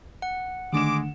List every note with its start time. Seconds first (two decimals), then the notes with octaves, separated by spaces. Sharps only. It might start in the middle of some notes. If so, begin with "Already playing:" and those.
0.22 F#5
0.73 D3 D#3 G#3 A3 D4 D6 E7